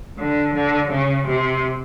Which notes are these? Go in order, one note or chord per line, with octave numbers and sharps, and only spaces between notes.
D3
D3
C#3
C3